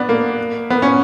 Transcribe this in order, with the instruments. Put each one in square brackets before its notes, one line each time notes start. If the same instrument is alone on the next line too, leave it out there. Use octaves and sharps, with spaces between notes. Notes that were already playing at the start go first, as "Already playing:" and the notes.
Already playing: [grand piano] B3 D4
A#3
B3
C#4